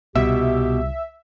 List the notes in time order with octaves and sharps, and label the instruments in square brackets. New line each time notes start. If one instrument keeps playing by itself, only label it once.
[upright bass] C2 G3 [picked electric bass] B2 [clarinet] G4 [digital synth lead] E5